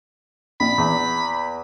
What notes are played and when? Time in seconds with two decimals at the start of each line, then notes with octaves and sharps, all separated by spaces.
0.60 A#1 B5
0.78 E2